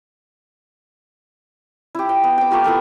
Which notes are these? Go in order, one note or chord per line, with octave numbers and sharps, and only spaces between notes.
E4 G4
G5
B3
G5 D6
A3 A#3 F4 G4
B3 E4 A4 A#4